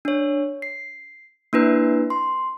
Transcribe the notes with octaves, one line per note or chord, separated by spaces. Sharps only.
D4 C#5
C7
A#3 D4 E4 B4
C6